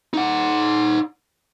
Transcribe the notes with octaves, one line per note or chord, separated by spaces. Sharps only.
D#4 F#5